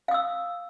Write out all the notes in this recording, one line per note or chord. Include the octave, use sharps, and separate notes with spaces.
F5 D#6 E6